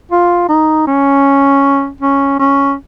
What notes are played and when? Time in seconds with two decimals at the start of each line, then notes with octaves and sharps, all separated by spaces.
0.11 F4
0.49 D#4
0.87 C#4
2.01 C#4
2.39 C#4